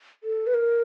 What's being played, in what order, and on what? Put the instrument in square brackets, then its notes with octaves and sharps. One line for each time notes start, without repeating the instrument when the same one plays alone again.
[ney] A4
B4
A#4